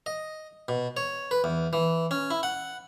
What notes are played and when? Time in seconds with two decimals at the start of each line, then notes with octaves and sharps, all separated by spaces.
0.06 D#5
0.68 B2
0.97 C#5
1.31 B4
1.44 E2
1.73 E3
2.11 C#4
2.31 E4
2.43 F#5